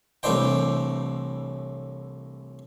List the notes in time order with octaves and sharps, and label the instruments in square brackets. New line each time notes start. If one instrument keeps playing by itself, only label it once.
[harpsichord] C2 A2 E3 D4 C5 G5